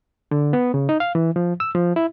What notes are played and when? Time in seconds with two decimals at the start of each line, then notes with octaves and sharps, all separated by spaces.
0.31 D3
0.53 B3
0.74 C#3
0.89 D#4
1.00 F5
1.15 E3
1.36 F3
1.60 E6
1.75 F3
1.96 E4